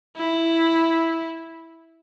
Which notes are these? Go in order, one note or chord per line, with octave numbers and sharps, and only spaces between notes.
E4